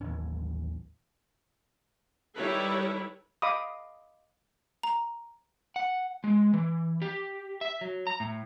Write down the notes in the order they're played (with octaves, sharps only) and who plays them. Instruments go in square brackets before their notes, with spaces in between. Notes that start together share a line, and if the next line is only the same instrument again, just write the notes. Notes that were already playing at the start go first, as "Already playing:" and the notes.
[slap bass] A1 D#2 A2 C#4
[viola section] D#3 G3 E4 A4 B4 C#5
[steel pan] D#5 F5 B5 D6 D#6
[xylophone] A#5
[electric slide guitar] F#5
G#3
E3
G4
E5
F#3
A#5
A2